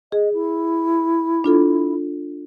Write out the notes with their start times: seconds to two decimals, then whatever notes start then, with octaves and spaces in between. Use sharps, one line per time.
0.12 G#4 D#5
0.33 E4
1.44 D4 F4 A4